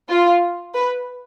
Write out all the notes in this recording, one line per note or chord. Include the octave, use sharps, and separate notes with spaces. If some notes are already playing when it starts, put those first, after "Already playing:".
F4
B4